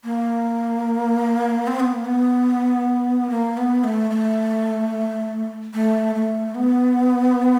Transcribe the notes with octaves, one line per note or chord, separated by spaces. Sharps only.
A#3
C4
B3
A#3
B3
A#3
B3
A3
A3
A3
A3
B3